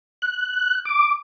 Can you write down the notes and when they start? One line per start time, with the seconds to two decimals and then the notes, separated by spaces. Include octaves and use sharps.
0.22 F#6
0.85 D6